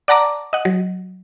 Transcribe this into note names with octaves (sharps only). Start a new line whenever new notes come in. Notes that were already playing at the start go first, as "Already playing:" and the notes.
D5 F#5 A5 A#5 D6
D#5 F#5
F#3